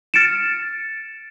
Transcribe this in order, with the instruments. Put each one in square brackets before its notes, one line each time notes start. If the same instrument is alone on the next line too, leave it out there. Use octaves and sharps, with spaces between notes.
[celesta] F6 A6 C#7 D7 E7